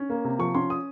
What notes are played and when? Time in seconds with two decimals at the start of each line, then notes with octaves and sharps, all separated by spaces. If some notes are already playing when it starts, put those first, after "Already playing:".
Already playing: C#4
0.10 A#3
0.25 C3
0.39 F3 C#6
0.55 C#4 C6
0.70 D#6